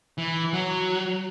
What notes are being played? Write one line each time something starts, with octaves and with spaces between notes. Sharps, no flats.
E3
F#3